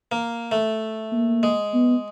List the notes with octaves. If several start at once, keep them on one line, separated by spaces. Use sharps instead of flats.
A#3
A3
A#3
G#3
B3